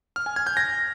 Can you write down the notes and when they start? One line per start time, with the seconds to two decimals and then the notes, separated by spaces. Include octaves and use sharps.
0.16 F6
0.26 G#5
0.36 G#6
0.47 G6
0.57 A#6